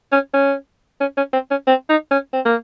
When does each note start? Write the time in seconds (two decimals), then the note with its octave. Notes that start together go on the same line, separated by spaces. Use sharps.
0.12 C#4
0.34 C#4
1.01 C#4
1.17 C#4
1.33 C4
1.51 C#4
1.67 C4
1.89 D#4
2.11 C#4
2.33 C4
2.45 A#3